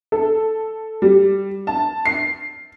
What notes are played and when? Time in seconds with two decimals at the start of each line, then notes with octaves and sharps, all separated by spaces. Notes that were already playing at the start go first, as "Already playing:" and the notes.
0.12 A4
1.02 G3
1.67 A5
2.05 C7